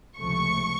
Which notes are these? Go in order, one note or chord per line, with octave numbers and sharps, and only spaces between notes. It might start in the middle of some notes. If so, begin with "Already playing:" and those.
C#2 C3 F3 A3 C#6